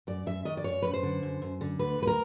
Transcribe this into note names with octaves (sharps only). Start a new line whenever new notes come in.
F#2 D5
F#2 E5
D#3 D#5
D5
F#2 C#5
F#2 B4
C5
D3
F#2
F#2
D3
D2 B4
D2 B4
A#4